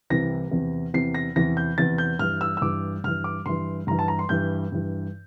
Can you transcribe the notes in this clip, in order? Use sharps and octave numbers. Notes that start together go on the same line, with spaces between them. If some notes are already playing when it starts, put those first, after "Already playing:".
C2 C3 E3 A#6
E2 C3 E3
E2 C3 E3 C7
A#6
E2 C3 E3 A#6
G6
E2 C3 E3 A6
G6
G2 E3 F6
E6
E6
G2 E3 D6
G2 E3 F6
D6
G2 E3 C6
G2 E3 A#5
A5
A#5
C6
G2 E3 G6
G2 E3